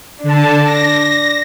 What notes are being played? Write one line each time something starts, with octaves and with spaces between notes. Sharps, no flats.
D3 D4 A5
A#6